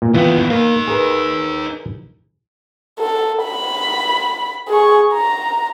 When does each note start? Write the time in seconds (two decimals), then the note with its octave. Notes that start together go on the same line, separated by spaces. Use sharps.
0.02 A#2
0.14 D#2 E3 B3 F4 G5
0.50 A#3 D#4 F5
0.88 G#4 A#4 B4
3.00 A4
3.44 B5
4.69 G#4 C#6
5.14 A#5